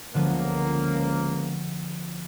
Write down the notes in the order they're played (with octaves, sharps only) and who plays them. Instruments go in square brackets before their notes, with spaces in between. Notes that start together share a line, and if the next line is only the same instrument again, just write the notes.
[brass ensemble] C#2 A#3 [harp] D3 F3 B3